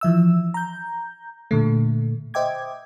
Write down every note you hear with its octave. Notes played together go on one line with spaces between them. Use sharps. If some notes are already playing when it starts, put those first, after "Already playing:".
E3 F3 E5 E6
A#5 G6
A#2 D3 A3
C5 D#5 E5 G5 D6 G#6